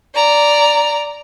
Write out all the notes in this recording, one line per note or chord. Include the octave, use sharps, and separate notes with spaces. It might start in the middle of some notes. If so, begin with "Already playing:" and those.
D5 A#5